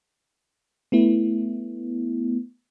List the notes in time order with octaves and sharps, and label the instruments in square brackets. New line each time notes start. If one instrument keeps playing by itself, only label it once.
[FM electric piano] A3 B3 E4